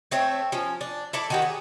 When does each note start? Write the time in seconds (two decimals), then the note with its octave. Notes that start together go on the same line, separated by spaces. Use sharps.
0.11 A3 C4 C#5 E5
0.52 F3 C#4
0.81 D4
1.13 E4 A4 D5
1.30 D#3 F#4 G4
1.42 G#4